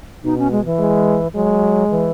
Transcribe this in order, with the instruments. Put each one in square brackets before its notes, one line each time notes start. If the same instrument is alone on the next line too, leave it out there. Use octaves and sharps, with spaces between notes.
[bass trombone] B2 [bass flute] D#4
[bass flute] C#4
G#3
E3
[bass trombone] G#3
[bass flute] F#3 [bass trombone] G#3
[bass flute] E3